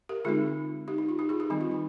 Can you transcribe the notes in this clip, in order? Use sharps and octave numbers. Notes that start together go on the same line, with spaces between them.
G4 A#4
D3 G#3 C4 D#4 F4 G#4
D#4 G4
D#4
F4
D#4 G4
F4 G#4
D#4 G4
D#3 G3 C4 D#4
F4
F4